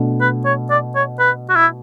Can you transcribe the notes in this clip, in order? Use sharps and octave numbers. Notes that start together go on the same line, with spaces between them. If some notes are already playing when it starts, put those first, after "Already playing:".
Already playing: B2 A3 D4
B4
C#5
D5
C#5
B4
F#4
E4